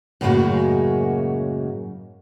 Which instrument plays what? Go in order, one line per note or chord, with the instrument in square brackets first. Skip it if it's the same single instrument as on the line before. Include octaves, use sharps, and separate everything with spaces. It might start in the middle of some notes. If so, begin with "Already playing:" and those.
[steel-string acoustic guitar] F#2 A2 C#3 G#3 A#3 F#4